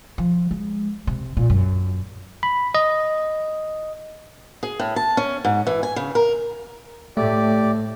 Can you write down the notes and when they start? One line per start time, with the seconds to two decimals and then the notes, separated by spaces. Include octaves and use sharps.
0.18 F3
0.51 G#3
1.07 C3
1.37 A#2
1.50 F#2
2.43 B5
2.75 D#5
4.63 G#4
4.80 A2
4.96 A5
5.17 C#4
5.45 G#2
5.67 E3
5.83 G#5
5.96 C#3
6.15 A#4
7.17 A2 A3 G4 D5